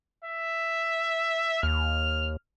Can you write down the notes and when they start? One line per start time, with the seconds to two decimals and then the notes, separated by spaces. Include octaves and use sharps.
0.24 E5
1.63 D#2 F6